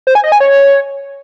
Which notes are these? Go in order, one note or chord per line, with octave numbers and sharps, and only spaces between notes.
C5
G#5
D#5
G#5
C#5